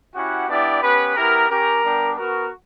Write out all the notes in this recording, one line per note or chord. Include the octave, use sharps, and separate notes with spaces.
C#4 E4 F#4 G4 F#5
B3 D4 E4 G4 D5
B3 C#4 G4 B4
B3 E4 G4 A#4
C#4 G4 A#4
G3 B3 D4 G4
B3 F#4 A#4